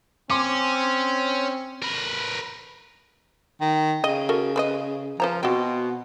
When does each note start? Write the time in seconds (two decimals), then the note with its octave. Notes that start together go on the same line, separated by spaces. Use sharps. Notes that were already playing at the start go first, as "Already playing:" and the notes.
0.30 C4 C#4 C6 D6
1.83 A#4 B4
3.61 D#3
4.04 C#3 D#5
4.29 F#4 A4 A#4
4.56 B4 C5 D#5
5.20 F3 B4 C5 A#5
5.43 B2 C4 F#4